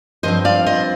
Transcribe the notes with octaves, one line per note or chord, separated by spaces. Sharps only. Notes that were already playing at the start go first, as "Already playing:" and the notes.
G2 F3 C4 C5 D#5
D5 F5
C5 D#5